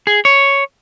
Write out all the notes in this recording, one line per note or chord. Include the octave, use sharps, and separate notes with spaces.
G#4
C#5